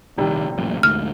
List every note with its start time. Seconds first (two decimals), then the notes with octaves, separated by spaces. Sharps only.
0.17 A#1 A2 C3 D#3 G3
0.57 A1 F#2 A#2
0.83 D2 G#2 F6